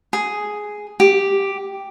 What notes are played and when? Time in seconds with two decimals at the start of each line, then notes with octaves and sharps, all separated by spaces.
0.13 G#4
1.00 G4